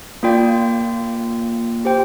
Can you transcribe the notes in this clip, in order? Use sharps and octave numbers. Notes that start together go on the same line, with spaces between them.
A#3 F4 D5 G5
G4 C5 G5